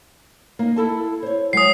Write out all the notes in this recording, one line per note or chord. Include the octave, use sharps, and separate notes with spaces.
A#3 D#4
E4 A4 A5
C5 C#5
F#3 G#3 D#6 C7